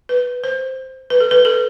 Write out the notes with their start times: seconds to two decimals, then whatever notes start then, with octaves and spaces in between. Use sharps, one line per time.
0.09 B4
0.44 C5
1.10 B4
1.20 A4
1.31 B4
1.45 A4